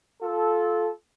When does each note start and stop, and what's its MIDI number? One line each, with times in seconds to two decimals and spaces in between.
0.21 0.88 65
0.21 0.88 69